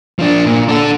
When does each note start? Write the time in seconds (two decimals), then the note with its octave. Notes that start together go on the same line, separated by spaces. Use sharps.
0.19 F3 D4
0.46 A#2
0.68 D4 A4